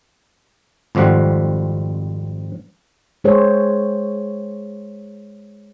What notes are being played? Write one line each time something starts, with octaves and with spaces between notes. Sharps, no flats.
G#1 F2 F3 G3 F#5
G#3 G#4 C5 C#5